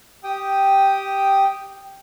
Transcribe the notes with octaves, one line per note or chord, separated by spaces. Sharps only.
G4 G5 D#6